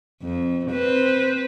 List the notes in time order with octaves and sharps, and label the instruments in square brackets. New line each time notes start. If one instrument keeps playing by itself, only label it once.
[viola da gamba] F2
C4 B4 C5